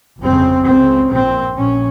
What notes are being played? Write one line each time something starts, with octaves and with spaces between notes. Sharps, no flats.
G1 F2 C#3 C4
C#2 C#3 C4
A#1 A#2 C4
A#1 A#2 C#4